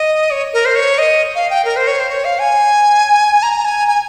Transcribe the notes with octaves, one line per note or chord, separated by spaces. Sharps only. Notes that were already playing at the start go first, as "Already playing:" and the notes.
Already playing: D#5
C#5
A#4
C5
C#5
D#5
F5
G5
A#4
C5
C#5
C5
C#5
F5
G#5
A#5
G#5
G#5